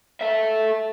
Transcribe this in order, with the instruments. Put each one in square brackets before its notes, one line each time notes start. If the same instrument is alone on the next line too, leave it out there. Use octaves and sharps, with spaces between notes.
[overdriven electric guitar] A4 E5